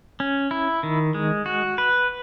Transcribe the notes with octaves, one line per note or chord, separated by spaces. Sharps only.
C#4
E4
D#3
G#3
F#4
B4